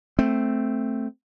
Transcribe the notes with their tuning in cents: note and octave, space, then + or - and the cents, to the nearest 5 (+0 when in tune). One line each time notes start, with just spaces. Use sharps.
A3 +0 C4 +0